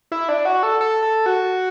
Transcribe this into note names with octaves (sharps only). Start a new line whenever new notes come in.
E4
D4
F#4
A4
A4
A4
F#4